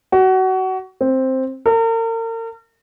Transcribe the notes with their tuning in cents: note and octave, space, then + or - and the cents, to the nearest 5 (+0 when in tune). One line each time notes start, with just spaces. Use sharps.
F#4 +25
C4 +5
A#4 -40